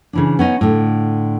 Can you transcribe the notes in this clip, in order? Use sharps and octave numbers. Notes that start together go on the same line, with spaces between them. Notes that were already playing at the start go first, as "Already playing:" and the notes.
C#3 E3 D4
B3 C#4 D#4
A2 D3